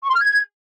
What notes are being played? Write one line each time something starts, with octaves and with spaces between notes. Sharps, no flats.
C#6
C6
F6
G#6